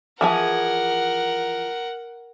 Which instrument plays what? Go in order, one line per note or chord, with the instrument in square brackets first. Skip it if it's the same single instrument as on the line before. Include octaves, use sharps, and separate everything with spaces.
[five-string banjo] E3 F3 G#4 [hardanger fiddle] A#4 F#5